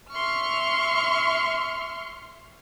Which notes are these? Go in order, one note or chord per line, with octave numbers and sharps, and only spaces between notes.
E5 C6 C#6 F6